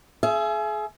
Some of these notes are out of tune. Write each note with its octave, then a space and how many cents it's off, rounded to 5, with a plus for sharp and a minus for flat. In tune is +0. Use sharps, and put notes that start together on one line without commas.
G#4 +30 E5 +35